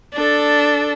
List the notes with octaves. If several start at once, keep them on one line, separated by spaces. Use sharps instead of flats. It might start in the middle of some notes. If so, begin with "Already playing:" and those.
D4 A4